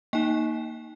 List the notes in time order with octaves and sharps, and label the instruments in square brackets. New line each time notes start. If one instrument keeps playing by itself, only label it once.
[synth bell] A#3 D#4 G5